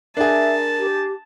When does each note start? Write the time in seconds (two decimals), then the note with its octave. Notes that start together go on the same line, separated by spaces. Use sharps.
0.17 D4 G#4 A#4 E5 A5
0.78 G4